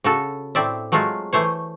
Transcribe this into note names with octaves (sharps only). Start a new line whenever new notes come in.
C#3 F#4 A4
A2 C4 D5 E5
F#3 G#3 A3 F4 F#4
E3 A3 C5 C#5